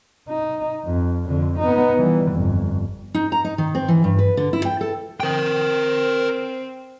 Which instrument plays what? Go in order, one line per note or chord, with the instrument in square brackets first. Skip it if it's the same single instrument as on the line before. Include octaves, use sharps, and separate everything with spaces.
[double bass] D#4
F2
F2 D3
B3 D#4
E3 G3
G1 F2
[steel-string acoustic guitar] D#4
A#5
D#4
D#3
C4
E3
G2
B4
D3
E4
G5
A4
[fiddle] C4 [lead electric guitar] A#4 G5